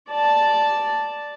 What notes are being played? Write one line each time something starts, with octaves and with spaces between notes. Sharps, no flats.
D5 A5